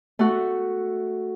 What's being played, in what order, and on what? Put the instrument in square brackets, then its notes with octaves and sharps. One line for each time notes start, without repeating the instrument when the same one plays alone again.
[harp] A3 F#4